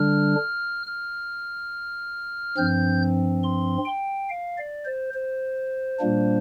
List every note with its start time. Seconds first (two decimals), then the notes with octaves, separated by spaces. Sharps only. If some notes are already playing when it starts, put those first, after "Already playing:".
Already playing: D3 G3 D4 F6
0.87 F6
2.57 G2 F3 C4 G6
3.43 C6
3.85 G5
4.29 F5
4.58 D5
4.85 C5
5.14 C5
6.00 A#2 G3 A#3 D4